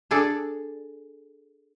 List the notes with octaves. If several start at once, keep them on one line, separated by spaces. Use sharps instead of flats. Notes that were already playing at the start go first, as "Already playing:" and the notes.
D4 G#4 A4 D5